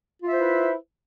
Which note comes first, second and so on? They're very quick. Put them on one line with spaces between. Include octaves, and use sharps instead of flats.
F4 E5 C5 E4 B4